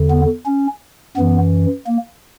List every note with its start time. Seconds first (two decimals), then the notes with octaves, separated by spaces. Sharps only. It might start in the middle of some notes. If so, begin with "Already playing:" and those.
Already playing: E2 D3
0.11 B3
0.46 C#4
1.17 F#2 E3 B3
1.87 A#3